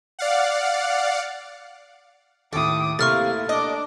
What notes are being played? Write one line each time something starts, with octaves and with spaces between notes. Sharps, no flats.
D5 F5 F#5
D#2 A2 A4 D6 D#6
C3 A3 A#3 E4 F5 C#6 F6 A6
D4 D#5 D6